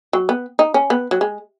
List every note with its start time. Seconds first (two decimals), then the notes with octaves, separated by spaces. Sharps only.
0.13 F#3
0.29 B3
0.59 D#4
0.74 C#4
0.90 B3
1.11 F#3
1.21 G#3